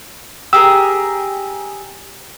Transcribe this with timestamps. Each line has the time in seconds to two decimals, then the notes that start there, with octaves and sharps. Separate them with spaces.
0.53 G4 G#4 A#4 E6